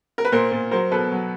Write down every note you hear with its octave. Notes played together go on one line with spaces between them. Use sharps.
A#4
B4
A#2 A#4 C5
A#2
F#3 A#4 C5
B2 A4 B4
F#3